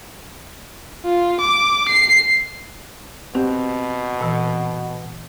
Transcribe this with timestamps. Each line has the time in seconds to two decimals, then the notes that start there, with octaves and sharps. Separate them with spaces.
1.05 F4
1.41 D6
1.89 C7
3.35 B2 C4 G4
4.21 A#2 E3